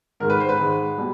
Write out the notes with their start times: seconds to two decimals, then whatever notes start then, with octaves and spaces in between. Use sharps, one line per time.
0.20 G#2 D#3 G#3 A#4
0.30 B4
0.40 C5
0.49 B4
0.58 G#2 D#3 G#3
0.98 B2 G3